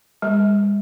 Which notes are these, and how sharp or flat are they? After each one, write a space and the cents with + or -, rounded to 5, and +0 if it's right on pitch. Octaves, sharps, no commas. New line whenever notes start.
G#3 -45